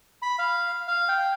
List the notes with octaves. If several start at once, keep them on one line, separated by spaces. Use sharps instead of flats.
B5
F5
F5
G5